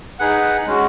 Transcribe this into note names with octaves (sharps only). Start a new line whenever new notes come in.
D#4 G#4 B4 F#5
G#3 C#4 F#4